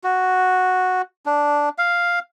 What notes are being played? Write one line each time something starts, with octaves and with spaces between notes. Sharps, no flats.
F#4
D4
F5